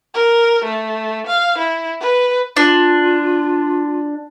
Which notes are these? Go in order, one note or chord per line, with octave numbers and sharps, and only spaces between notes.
A#4
A3
F5
E4
B4
D4 F4